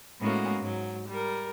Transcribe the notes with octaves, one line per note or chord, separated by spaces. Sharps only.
A2 G#3 A#3 B3 C#4 F#4
G#2 F#3
G3 A#4